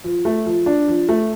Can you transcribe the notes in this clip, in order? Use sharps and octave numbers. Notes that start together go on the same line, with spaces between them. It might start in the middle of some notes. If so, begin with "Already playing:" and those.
F3
A3
F3
D4
F3
A3